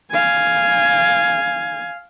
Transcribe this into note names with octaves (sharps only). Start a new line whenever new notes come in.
F5 G#5